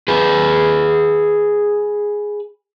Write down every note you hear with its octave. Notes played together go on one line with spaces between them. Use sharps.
G#4 B4